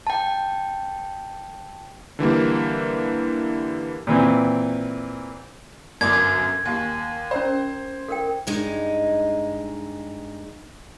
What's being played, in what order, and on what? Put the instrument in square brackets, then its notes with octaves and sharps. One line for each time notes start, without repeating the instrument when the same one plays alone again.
[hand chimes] G5 A5
[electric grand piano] D3 E3 G3 A#3
[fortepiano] A#2 E3 C4
[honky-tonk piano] G1 F#2 [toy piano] A#4 D6 D#6 [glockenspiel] G#6
[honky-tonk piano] D#2 [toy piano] G4 G#5
[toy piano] C#4 A#4 A#5 [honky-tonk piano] C5
[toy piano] A4 A#4 G5
[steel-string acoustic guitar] G2 G#3 D#4